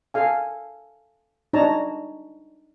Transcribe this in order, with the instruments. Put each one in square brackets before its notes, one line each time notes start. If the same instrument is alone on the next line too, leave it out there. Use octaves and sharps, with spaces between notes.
[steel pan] A4 F5 G#5
D4 D#4 C#5 A5 A#5